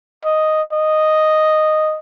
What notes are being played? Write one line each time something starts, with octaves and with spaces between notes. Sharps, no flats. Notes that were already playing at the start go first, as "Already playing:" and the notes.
D#5
D#5